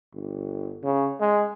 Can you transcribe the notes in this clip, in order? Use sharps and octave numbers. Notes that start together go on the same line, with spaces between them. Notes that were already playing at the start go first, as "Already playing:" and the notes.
G1
C#3
G#3